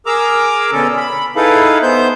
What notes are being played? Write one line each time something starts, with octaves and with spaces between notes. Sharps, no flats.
G#4 A#4 A#5 D6 E6
B2 D3 C#4 A4
B5
D#4 E4 G#4 A4 B4 F5
B3 C5 G6